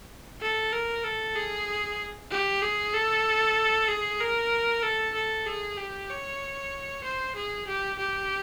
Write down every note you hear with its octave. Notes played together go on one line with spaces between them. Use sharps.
A4
A#4
A4
G#4
G4
G#4
A4
G#4
A#4
A4
A4
G#4
G4
C#5
C5
G#4
G4
G4